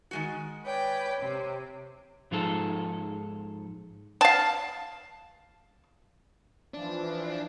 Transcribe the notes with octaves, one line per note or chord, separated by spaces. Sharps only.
D#3 G#3 F#4
B4 C#5 D5 G5
C3
G#2 F3 D#4 G#4 A4
F5 A5
E3 F3 D4